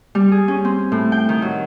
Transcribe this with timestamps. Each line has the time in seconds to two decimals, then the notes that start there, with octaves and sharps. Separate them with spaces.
0.15 G3
0.32 G#4
0.48 C#4
0.65 C4
0.92 A2
1.12 G5
1.29 D#3
1.42 F#3